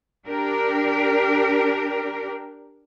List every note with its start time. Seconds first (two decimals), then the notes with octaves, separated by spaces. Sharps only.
0.26 D4 G4 A#4